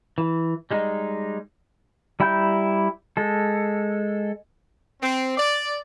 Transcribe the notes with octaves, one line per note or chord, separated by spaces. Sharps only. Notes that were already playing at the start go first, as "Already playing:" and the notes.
E3
G3 G#3 D#4
G3 E4 G5 A#5 G6
G#3 A4
C4
D5